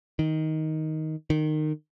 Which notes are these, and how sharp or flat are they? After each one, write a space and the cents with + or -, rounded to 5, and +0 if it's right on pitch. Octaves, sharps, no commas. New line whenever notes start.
D#3 +10
D#3 -20